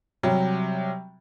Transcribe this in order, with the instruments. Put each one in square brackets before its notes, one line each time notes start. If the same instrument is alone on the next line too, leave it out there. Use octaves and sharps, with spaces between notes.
[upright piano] C3 F#3 G3